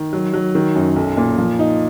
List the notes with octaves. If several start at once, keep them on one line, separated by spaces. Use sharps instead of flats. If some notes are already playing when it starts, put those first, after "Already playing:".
Already playing: D#3
F#3
F#3
D#3
F#2
B1
A#2
F3
D#4